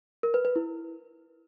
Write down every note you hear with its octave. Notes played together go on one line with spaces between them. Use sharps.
A#4
B4
B4
E4